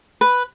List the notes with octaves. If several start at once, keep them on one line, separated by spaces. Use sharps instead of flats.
B4